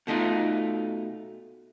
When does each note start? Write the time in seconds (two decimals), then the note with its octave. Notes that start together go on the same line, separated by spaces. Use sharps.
0.07 B2 A3 D#4 F4